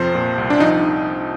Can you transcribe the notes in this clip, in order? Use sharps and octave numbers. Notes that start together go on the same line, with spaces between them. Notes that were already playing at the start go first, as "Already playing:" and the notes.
Already playing: F2 C3 F3 C5
A#2
C2
D4
F3 D#4